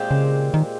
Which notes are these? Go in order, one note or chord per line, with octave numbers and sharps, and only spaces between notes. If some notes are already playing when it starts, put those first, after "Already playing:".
Already playing: A#2 G#3 C4 G4
C#3
D#3